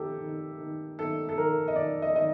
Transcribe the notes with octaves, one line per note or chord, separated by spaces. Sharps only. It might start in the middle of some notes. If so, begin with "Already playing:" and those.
Already playing: D#3 C4 G4 A4
D#3
D#3
D#3 A4
A4
D#3 A#4
D#5
D#3 D5
D#5
D#3 D#5